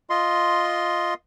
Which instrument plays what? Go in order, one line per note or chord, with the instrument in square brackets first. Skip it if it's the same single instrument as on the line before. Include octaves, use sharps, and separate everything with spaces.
[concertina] F4 D#5 C6